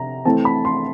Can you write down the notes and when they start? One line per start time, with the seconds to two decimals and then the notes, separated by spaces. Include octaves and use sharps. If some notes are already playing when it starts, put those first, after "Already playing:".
Already playing: C3 A#5
0.25 E3 A3 C4 A5
0.45 B5
0.65 C6